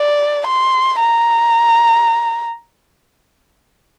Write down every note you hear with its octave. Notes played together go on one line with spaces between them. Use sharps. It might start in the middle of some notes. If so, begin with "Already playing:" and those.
Already playing: D5
C6
A#5